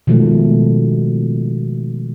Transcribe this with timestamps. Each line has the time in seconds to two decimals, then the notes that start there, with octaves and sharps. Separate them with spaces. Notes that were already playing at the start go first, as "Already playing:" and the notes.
0.07 B2 D#3 F3 G#3 A3